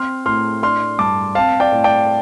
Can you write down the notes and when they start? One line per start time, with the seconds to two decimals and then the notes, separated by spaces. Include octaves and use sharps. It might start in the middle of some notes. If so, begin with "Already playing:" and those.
Already playing: C4 C6 F6
0.26 A2 C6 F6
0.63 D4 C6 F6
0.99 G2 A5 D6
1.35 C4 F5 A5
1.60 D5 G5
1.72 A2
1.84 D5 G5